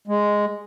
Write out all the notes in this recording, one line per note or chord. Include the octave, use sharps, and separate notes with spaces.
G#3